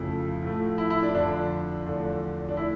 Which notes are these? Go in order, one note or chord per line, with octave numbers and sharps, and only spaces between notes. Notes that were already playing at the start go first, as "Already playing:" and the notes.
Already playing: F2 C#3 F3 A3 E4
A2 F3 A3
E4
E4
D4
F2 D3 F3 D4
E2 D3 F3 A3
D4
E3 A3 E4